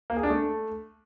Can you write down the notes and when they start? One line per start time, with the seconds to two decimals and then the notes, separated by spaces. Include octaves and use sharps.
0.10 A#3
0.17 G#4
0.23 D4
0.30 A3